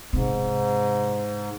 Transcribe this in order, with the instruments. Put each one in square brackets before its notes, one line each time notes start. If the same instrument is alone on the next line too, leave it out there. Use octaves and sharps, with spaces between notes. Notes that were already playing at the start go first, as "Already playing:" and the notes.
[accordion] G#2 [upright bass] C3